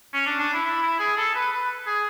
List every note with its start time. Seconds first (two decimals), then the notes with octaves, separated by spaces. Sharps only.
0.13 C#4
0.26 D4
0.39 D4
0.53 E4
0.65 E4
0.82 E4
0.99 G#4
1.17 A4
1.34 B4
1.51 B4
1.86 G#4